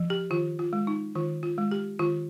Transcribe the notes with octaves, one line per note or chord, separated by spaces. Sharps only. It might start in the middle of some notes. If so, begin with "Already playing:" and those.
Already playing: F3
G4
D#3 F4
F4
G#3
D#4
D#3 F4
F4
G#3
G4
D#3 F4